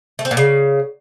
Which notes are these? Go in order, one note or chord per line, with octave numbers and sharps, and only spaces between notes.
A3
C4
A#2
C#3